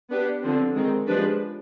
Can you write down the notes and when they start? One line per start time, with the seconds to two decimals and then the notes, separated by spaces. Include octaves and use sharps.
0.10 B3 D4 G4 B4
0.42 D3 F3 C4
0.75 D#3 G#3 C4
1.07 F3 G#3 D4 G4 B4